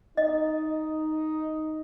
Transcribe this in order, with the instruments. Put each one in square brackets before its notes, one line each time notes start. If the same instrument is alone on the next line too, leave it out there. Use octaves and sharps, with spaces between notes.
[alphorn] D#4 [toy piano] D#5